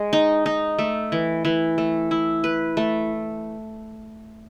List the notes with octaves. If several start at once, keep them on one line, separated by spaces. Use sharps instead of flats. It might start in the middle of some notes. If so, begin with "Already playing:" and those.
Already playing: G#3
D#4
D#4
A3
E3
E3
A3
E4
B4
A3